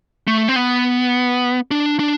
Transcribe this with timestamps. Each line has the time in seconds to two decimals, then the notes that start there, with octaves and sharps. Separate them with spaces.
0.27 A3
0.49 C4
0.56 B3
1.71 D4
1.99 D4